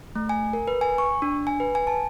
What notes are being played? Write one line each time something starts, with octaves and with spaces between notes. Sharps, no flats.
A3
G#5
A#4
B4
G#5
C#6
D4
G#5
B4
G#5
A5